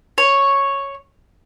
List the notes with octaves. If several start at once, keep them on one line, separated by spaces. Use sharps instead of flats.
C#5